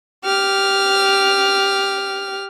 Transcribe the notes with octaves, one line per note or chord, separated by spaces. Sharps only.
G4 F6